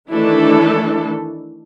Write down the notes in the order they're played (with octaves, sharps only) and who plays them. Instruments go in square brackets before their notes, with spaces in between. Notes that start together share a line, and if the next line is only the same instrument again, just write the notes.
[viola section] D#3 E3 A3 D4 E4 A4